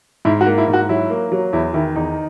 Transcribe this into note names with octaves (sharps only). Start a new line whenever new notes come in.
G#2 E4
F#4
A#3
E4
G#2
F#4
F#3 E4
A#3
F#3
E2 E4
D#3 E4
E2 D#4